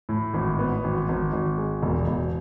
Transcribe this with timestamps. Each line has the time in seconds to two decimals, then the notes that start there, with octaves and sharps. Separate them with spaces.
0.09 A2
0.34 G#1
0.59 B3
0.84 G#1
1.09 G#1
1.33 G#1
1.58 G#3
1.83 E1
2.08 E1